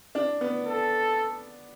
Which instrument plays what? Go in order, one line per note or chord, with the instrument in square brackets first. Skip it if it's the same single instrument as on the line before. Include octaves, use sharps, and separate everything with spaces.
[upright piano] D4
B3
[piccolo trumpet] A4